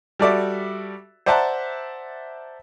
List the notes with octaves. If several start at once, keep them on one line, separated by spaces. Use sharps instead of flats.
G3 F#4 A4 D5 E5
C5 D5 E5 F#5 A5 A#5